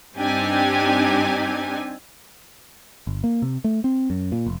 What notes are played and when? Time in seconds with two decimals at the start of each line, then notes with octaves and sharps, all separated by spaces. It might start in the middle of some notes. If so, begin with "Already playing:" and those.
0.17 G2 C4 D4 D#4 G4 G#5
3.07 G1
3.24 A#3
3.42 C3
3.64 A3
3.84 C4
4.10 F#2
4.32 A#2
4.47 F1